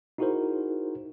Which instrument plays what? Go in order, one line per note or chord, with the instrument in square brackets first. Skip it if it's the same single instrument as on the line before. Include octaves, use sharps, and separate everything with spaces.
[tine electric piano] D#4 E4 F#4 G#4 A#4 C5